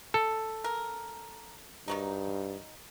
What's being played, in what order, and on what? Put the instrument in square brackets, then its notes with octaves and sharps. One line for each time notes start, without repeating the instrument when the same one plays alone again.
[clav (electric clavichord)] A4
[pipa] A#4
[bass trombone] G2 [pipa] D#3 F#3 D#4